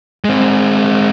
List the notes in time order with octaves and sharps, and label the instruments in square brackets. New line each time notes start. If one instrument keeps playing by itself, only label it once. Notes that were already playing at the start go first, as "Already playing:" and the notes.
[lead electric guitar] G#3 C4